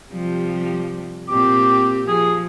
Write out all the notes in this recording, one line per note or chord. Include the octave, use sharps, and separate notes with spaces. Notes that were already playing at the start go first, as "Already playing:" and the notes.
C3 F3 G3
A#2 C4 G4 D6
F3 G#4